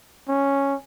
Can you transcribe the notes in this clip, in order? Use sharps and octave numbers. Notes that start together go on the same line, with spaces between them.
C#4